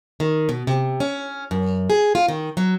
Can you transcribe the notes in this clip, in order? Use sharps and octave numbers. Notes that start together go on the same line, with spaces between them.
D#3
B2
C3
C#4
F#2
G#4
F4
D#3
F#3